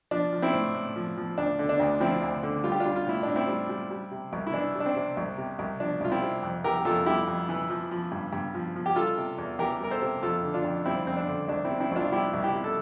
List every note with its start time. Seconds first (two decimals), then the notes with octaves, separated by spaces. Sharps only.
0.11 F3 D4
0.32 F3
0.42 C4 E4
0.53 A2
0.75 A2
0.96 F3
1.17 F3
1.38 D2 D4
1.59 D3
1.69 D4
1.80 D2
2.00 F3 C4 E4
2.22 D2
2.43 D3
2.64 G3 F4
2.72 G4
2.80 D4 F4
2.86 G3
2.96 F4
3.06 A2 E4
3.23 A2 D4
3.36 C4 E4
3.48 G3
3.69 G3
3.91 G3
4.12 C3
4.33 C2
4.47 E4
4.54 E3 D4
4.75 G3
4.80 D4
4.86 C4
4.96 C3
5.17 C2
5.38 C3
5.59 C2
5.80 F3 D4
6.01 C2 F4
6.12 C4 E4
6.22 C3
6.43 F2
6.64 E3 G4 A#4
6.77 G4
6.85 F2 F4 A4
7.06 G3 E4 G4
7.28 F2
7.49 E3
7.70 F3
7.91 F3
8.12 G2
8.33 G2
8.54 F3
8.76 F3
8.86 G4
8.96 G3 F4 A4
9.17 C3
9.38 E2
9.59 E3 G4 A#4
9.80 G3 A#4
9.91 A4 C5
10.02 C3
10.22 F2 F4 A4
10.43 D3
10.54 D4 F4
10.65 F2
10.86 G3 C4 E4
11.07 F2 C4
11.17 D4
11.28 D3
11.48 C2 D4
11.64 C4 E4
11.71 C3
11.80 C4 E4
11.92 C2 D4 F4
12.12 G3 E4 G4
12.34 C2
12.44 E4 G4
12.54 C3
12.64 A4